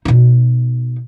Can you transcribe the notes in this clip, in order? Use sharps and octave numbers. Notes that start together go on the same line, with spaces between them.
B2 D#4